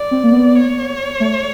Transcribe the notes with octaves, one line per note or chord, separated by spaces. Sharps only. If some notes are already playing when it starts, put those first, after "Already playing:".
Already playing: D5
C4
A#3
B3
C#5
A3